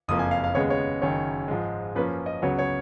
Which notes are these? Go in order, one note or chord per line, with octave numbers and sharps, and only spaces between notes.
F#1 F2 F3 A#3 D#6
G#5
F5
F5
D#2 C#3 G#3 B3 C#5
C#5
F#1 F#2 D#3 C#5
G#2 F3 G#3
F#2 F3 A#3 C#4 B4
D#5
C#2 C#3 F#3 B3 C#5
C#5